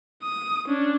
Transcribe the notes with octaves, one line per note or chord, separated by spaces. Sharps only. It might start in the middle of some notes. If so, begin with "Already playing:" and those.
D#6
C#4 D4